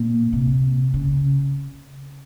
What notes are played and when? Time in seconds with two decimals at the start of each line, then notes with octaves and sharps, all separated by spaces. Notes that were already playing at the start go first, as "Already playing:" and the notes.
Already playing: A#2
0.33 C3
0.94 C#3